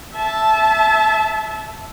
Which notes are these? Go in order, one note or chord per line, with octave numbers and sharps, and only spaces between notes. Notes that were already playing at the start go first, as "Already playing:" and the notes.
E5 A5